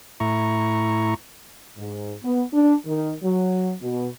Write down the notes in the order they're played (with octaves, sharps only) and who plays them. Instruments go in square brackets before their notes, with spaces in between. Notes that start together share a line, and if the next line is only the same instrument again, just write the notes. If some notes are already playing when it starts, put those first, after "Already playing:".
[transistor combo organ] A2 E4 A#5 C#6
[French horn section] G#2
B3
D4
D#3
F#3
B2